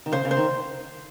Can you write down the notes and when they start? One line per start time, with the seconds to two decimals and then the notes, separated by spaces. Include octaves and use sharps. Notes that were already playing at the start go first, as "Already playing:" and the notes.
0.06 D#3
0.12 C#3 C5
0.25 C#3
0.31 C5
0.37 D#3